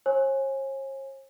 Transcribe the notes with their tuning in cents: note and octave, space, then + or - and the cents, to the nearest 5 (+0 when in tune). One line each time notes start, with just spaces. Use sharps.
C#5 -45 G#5 +0